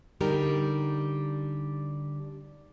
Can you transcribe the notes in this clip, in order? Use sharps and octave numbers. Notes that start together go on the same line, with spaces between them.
D3 G3 D#4 G4 A#4